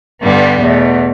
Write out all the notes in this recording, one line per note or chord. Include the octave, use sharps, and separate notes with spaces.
G2 D3 G3 B3
E2 B2 A3